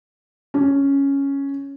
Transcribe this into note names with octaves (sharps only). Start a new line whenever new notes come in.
C#4